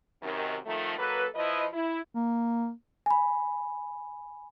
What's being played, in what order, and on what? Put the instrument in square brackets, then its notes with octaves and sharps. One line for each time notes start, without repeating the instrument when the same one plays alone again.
[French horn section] F#2 C3 D#3
D#3 F3 A3
F#3 A#3 A4 B4
F3 E4 B4 D#5
E4
[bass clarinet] A#3
[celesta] G#5 B5